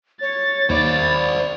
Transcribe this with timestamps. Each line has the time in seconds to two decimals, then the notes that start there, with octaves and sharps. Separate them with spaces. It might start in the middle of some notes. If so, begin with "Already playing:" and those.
0.21 C#5 A6
0.70 D#2 C5 D5 B5